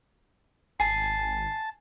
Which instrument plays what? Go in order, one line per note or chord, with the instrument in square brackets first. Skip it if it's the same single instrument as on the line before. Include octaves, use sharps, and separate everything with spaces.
[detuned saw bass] G#1 [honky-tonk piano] G#5 [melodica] A5 [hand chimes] C7